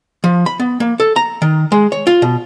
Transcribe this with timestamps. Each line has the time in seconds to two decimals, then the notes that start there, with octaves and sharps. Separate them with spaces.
0.24 F3
0.46 B5
0.60 B3
0.80 A#3
1.00 A4
1.16 A#5
1.42 D#3
1.72 G#3
1.92 C#5
2.07 F4
2.22 B2